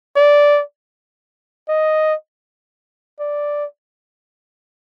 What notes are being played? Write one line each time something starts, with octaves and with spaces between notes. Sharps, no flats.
D5
D#5
D5